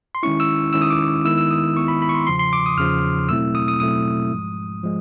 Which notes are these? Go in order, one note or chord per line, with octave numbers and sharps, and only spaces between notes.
C6
D#3 G#3 C#4 E4 C#6
E6
D#3 G#3 C#4 E4 E6
D#6
D6
D#3 G#3 B3 E4 E6
E6
D#6
D#3 G#3 B3 E4 C#6
B5
B5
C#6
C6
E2 C#3 F3 C6
C6
D6
D#6
E2 C#3 F3 F6
B2 F#3 A3 C4 E4 E6
D#6
D#6
B2 F#3 A3 C4 E4 D#6
G#2 F3 G#3
F3 G#3